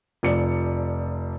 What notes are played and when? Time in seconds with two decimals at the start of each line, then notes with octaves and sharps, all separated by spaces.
0.23 F1 F3 D5 C#7